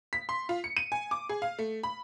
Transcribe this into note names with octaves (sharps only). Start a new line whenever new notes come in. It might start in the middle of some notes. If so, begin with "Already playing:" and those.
B6
C6
F4
C#7
D#7
G#5
D6
G#4
F5
A3
B5